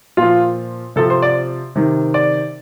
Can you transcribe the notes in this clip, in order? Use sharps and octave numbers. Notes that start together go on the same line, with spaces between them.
A#2 F3 F4
C3 F3 A4
C5
D5
C3 D#3
D5